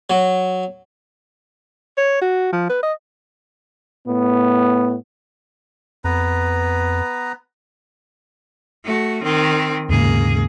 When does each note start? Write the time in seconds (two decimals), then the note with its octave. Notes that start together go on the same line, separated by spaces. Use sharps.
0.10 F#3
1.97 C#5
2.21 F#4
2.52 F3
2.69 B4
2.83 D#5
4.06 A2 B3
6.04 F2 B3 B4 A#5
8.84 A3 F#4
9.23 D#3 C4
9.89 D#2 G#2 C#3 A#3 G#4